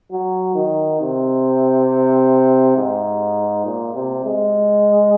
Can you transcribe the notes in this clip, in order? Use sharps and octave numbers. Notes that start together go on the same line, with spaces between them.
F#3
D#3
C3
G#2
A#2
C3
G#3